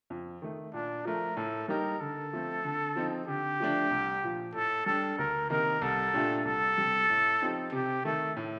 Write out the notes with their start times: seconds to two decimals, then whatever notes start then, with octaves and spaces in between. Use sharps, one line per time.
0.10 F2
0.42 D#3 A3
0.74 A#2 D4
1.05 F3 A3 A#4
1.37 A2 A4
1.68 G3 A#3 D#4 G4 A#4
2.01 D3 A4
2.33 F3 A3 C4
2.64 D3
2.96 F3 C4 D#4
3.27 D3 G4
3.60 F3 A3 D4
3.91 C2
4.23 A#2 F3
4.54 A2 A4
4.86 G3 D4 G4 A4
5.18 D2 A#4
5.50 C3 D#3 A#3 D#4 A#4
5.82 C2 A4
6.14 A#2 A3 D4 G4
6.45 C2 A4
6.78 C3 G3
7.10 A2
7.42 F3 C4 D#4 G4
7.72 C3 G4
8.05 D#3 A3 A4
8.36 A2